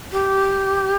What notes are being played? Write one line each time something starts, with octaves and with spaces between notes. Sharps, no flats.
G4